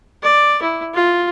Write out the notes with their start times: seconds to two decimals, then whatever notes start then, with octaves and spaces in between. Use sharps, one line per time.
0.22 D5
0.62 E4
0.94 F4